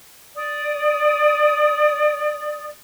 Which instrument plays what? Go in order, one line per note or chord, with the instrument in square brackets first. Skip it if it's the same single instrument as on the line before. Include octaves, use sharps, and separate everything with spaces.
[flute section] D5 D#6